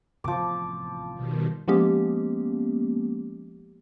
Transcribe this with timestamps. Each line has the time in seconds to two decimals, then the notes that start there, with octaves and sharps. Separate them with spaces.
0.24 A1 C3 F3 B3 D6
1.14 B2 D#3 G3
1.68 F3 G#3 A#3 B3 C#4 G4